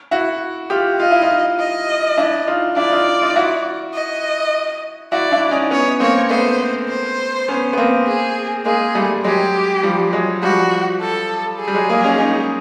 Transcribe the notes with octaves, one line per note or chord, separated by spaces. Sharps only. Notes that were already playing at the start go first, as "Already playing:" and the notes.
E4 F#4
F4 G4
F4 D#5
E4
D#4 F4
D#5
D4 E4
D#4 F4
D4 E4 D5
D#4 F4
D#4 F4
E4 F#4
D#5
E4 F#4 D5
D4 E4
C#4 D#4
B3 C#4 C#5
A#3 C4 C#5
A3 B3 C5
C5
B3 C#4
B3
A#3 C4
G#4
G#3 A#3 G#4
G3 A3
F#3 G#3 G4
F3 G3
F#3 G#3
F3 G3 F#4
A4
G#4
G3
F#3 G#3
G#3 A#3
C#4 D#4
C#4 D#4